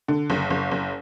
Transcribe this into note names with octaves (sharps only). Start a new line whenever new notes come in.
D3
F#1
F#1
F#1